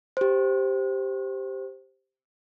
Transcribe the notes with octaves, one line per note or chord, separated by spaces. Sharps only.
G4 C5